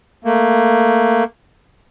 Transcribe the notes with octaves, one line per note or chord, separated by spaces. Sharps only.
A3 A#3